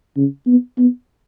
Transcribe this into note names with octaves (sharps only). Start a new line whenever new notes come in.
C#3
B3
B3